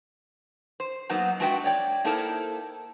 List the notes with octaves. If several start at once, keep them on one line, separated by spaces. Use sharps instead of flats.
C5
F#3 A#3 B3 D#4 F#4
G#3 D4 F#4 B4 E5 G5
C#5 D5 G5
A#3 D#4 E4 A4 A#4 C5